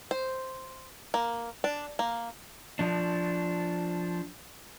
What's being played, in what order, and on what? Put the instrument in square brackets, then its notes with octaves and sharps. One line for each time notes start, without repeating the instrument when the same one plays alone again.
[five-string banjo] C5
A#3
D4
A#3
[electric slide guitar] F3 D4